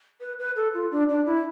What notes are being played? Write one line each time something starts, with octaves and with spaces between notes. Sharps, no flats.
B4
B4
A4
F4
D4
D4
E4